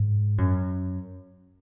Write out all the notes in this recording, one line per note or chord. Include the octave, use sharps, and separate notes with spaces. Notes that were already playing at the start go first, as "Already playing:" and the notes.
Already playing: G#2
F#2